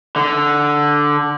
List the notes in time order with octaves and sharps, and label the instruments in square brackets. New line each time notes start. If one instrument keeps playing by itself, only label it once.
[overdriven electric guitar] D3